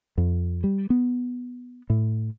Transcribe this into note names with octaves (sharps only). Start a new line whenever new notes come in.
F2
G3
B3
A2